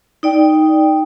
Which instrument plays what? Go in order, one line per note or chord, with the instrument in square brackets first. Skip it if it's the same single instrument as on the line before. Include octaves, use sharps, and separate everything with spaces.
[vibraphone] D#4 D5 G5